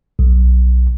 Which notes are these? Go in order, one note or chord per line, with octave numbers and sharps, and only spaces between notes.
B1